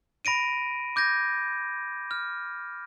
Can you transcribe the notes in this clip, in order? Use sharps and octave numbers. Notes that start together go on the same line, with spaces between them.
B5 A#6 D7 D#7
D6 G6 G#6 A#6
F6